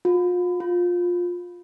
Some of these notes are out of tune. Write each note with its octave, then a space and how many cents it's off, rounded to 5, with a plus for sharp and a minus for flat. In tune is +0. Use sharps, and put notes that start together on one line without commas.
F4 +35
F4 +15